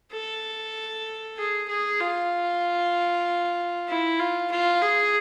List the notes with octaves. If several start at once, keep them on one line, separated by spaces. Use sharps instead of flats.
A4
G#4
G#4
F4
E4
F4
F4
G#4